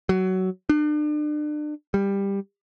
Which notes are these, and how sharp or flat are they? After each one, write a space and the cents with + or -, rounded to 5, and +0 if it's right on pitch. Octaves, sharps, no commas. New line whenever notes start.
F#3 +15
D4 +35
G3 +15